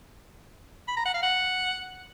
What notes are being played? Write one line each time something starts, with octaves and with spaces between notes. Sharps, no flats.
B5
A#5
F#5
F5
F#5